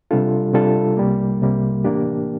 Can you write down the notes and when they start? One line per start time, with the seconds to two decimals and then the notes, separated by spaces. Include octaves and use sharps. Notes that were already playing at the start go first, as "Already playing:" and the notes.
0.11 C3 G3 D4 F4 A4
0.54 C3 G3 D4 F4 A4
0.97 C2 C3 G3 A#3
1.41 C2 C3 G3 A#3
1.84 A2 E3 A#3 D4 G4